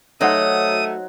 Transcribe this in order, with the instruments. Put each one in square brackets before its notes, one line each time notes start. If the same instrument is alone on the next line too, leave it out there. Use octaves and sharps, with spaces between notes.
[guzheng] F#3 [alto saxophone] A3 [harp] D#4 C5 F#5 [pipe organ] D#6